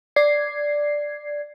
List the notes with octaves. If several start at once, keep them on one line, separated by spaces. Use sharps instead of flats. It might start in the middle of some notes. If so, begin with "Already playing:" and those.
D5 G#6 C7